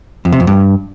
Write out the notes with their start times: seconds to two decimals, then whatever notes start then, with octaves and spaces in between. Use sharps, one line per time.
0.25 F2
0.32 C3
0.40 F2
0.47 G2